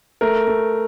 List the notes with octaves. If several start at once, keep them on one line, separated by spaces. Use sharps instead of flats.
A3 A#4
A3